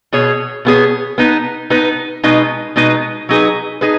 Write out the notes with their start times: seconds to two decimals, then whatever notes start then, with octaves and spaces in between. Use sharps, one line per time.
0.13 B2 B3 G#4 C#5
0.65 B2 B3 G#4 C#5
1.18 B3 D#4 B4
1.70 B3 D#4 B4
2.23 B2 G#3 D#4 B4
2.76 B2 G#3 D#4 B4
3.29 F#3 D#4 G#4 B4
3.81 D#4 G#4 B4